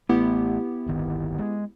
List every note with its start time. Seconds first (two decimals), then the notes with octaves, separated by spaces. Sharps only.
0.09 A1 A3 B3 E4 G4
0.86 D1 G1 D#3
1.38 G#3